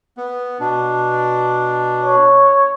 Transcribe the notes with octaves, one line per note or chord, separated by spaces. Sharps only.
B3
B2 D4
C#5